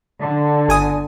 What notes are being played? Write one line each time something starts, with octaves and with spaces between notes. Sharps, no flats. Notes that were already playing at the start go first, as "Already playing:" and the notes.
D3
G1 G#5 D#6